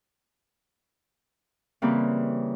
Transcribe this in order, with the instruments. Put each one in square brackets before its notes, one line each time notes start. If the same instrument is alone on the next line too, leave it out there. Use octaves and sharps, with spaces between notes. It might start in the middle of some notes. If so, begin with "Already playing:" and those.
[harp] C#3 E3 G3 A#3 C4